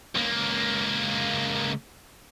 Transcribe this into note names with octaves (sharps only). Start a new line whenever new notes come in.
C#2 A#3